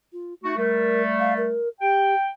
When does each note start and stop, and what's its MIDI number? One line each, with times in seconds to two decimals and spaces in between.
0.12 0.33 65
0.44 0.56 57
0.44 0.54 63
0.44 0.56 66
0.57 1.58 55
0.57 1.58 57
0.57 1.02 70
1.19 1.33 77
1.37 1.68 70
1.81 2.14 67
1.81 2.27 79